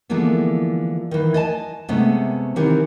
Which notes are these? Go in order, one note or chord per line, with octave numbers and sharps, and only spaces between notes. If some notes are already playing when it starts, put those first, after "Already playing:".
D3 E3 F3 G#3 A#3 B3
D#3 E3
D#5 G#5 A5
C3 G#3 A3 B3 C#4
D#3 E3 C4 G4 A#4 C#5